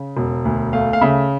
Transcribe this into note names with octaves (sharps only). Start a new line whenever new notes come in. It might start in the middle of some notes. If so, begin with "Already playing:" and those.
Already playing: C#3
E1
D2
A3 F5
F5
C#3 E5